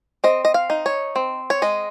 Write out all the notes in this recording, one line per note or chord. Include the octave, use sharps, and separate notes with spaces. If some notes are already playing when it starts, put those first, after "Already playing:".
C4 D#5
D#5
F5
D#4
C#5
C4
C#5
G#3 D#5